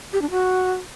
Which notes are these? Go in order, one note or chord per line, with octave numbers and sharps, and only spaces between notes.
G4
D4
F#4